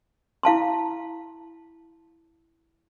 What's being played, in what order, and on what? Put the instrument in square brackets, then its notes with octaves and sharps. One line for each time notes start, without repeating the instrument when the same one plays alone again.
[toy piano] E4 F5 A5 C6